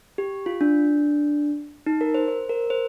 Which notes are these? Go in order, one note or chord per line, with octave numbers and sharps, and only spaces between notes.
G4
F4
D4
D#4
A#4
C5
C5
A#4
C5